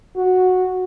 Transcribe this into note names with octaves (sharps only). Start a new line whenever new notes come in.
F#4